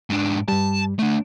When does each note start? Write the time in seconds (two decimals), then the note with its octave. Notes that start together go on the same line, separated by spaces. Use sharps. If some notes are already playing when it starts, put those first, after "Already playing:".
0.10 G#2 D4
0.48 G2 G3 A5
0.99 A3 D4